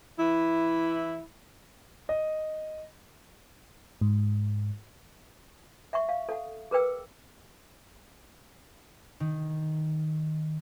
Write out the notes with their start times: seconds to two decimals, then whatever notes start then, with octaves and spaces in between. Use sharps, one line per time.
0.18 E3 E4
2.09 D#5
4.01 G#2
5.93 E5 F#5 C#6
6.09 F5
6.29 A4 F#5
6.71 G#4 A#4 B4 G5 E6
9.20 D#3